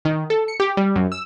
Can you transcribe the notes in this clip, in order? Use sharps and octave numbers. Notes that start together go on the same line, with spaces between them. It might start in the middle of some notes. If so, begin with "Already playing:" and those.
D#3
A4
C#7
G4
G3
F#2
E6